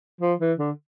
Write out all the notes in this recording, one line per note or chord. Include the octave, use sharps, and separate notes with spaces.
F3
E3
D3